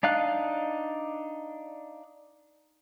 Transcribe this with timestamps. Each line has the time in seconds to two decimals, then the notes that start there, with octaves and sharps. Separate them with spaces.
0.03 D4 D#4 F5 F#6